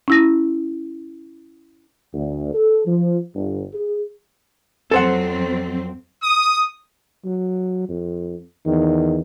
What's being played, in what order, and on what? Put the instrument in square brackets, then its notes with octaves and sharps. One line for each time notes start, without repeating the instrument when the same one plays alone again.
[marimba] C#4 E4 A#6
[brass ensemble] D2
A4
F3
G1
G#4
[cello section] F2 F#3 C4 [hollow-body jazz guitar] A4 C5 F#5
[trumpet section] D#6
[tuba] F#3
F2
[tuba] E2 [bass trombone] D#3